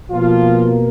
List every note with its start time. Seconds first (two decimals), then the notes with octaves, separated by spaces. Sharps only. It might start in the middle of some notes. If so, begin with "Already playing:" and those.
0.10 B2 F3 A#3 F4